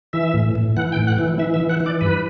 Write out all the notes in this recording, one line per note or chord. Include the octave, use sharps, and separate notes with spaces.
E3 E5
A2
A2
E3 F#5
G5
A2
F#5
E3
E3 E5
E5
E3
F#5
E3
D5
G2 B4